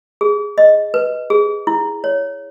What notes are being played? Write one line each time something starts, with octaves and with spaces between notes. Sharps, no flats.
G#4
D#5
B4
G#4
E4
C#5